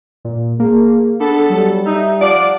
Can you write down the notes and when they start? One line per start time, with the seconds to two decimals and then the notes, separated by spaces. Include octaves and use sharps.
0.25 A#2
0.60 A#3 G#4
1.20 B3 D4 A4
1.50 F#3 G3
1.86 D#4 E5
2.21 F3 D5 F#5